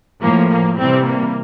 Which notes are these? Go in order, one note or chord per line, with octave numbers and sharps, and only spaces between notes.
A2 F3 A#3
A#3
C3 E3 G3 C4
A#3